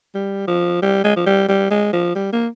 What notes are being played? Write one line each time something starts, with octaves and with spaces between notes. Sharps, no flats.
G3
F3
G3
G#3
F3
G3
G3
G#3
F3
G3
A#3